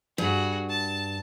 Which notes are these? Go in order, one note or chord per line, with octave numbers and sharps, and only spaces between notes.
G2 F#4 G#4
A5